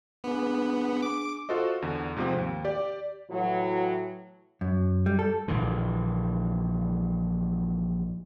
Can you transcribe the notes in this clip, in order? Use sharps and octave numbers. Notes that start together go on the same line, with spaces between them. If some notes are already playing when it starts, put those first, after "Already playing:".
B3 D4 G#4 G#5
D6
F4 F#4 A4 C5 D#5
E2 D3
G#2 C3 F3 A3 C4
D#2
G4 D5
A2 E3 F#3
F#2
G3
A4
A#1 G2 D3 E3